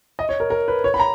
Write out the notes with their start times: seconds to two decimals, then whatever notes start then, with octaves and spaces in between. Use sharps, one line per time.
0.19 D#5
0.29 C#5
0.40 A#4
0.50 A#4
0.68 B4
0.84 C#5
0.94 B5
1.00 A#5